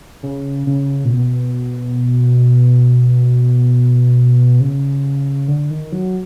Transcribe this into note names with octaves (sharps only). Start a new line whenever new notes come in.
C#3
C#3
A#2
B2
C#3
D3
D#3
F#3